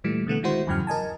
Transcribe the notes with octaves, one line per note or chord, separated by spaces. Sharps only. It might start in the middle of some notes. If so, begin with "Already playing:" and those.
A#2 E3 G3 A3
B2 D3 A3 B3
D#3 G#3 E4 F#4 C5
E2 G2 C#3 F#3 G5 F6
A#4 D#5 G#5 A5